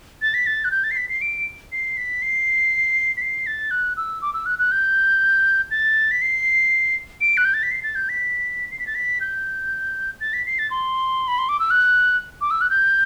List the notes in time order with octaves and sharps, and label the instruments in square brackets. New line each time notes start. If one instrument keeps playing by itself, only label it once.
[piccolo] A6
B6
A6
F#6
G6
A6
C7
B6
C7
D7
C7
B6
C7
B6
C7
A6
F#6
E6
D6
E6
F#6
F#6
G6
A6
B6
C7
D7
F#6
G6
A6
B6
C7
A6
G6
B6
C7
B6
A6
B6
G6
A6
B6
C7
A6
C6
B5
C6
D6
E6
F#6
D6
E6
F#6
G6